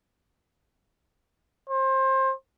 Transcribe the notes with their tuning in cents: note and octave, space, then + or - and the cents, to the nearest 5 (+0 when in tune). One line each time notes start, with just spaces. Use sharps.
C5 +25